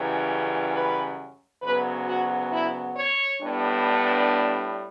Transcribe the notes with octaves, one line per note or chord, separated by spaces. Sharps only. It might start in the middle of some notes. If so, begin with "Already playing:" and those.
Already playing: F#2 C#3 E3 G3
B4
D2 C#3 F#3 B3 B4
F#4
E4
C#5
A2 G3 B3 D4